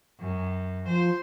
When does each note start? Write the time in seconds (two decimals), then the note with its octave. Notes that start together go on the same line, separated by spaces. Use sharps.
0.18 F#2
0.87 F3 C5